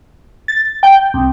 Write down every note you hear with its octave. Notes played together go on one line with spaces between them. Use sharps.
A6
G5
C2